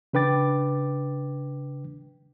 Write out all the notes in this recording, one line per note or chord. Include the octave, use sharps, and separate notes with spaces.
C#3 D4 B4 G5 D6 A6